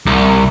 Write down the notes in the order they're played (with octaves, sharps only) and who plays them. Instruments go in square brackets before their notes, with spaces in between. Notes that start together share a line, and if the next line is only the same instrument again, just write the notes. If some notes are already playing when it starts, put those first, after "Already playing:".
[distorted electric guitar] C2